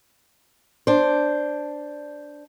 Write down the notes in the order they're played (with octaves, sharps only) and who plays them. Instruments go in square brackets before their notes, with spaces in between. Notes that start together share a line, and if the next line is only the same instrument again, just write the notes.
[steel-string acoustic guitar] D4 C5